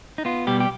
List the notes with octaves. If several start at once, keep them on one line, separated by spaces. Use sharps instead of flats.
D#4
B3 F4
B2 G3 G4
G4